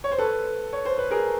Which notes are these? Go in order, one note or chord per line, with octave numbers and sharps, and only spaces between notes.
C#5
C5
A4 B4
C#5
C5
B4
G#4 A#4